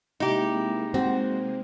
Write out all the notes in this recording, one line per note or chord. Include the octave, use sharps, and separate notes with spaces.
C3 G#3 A#3 D#4 E4 G4
C4 F#4 C5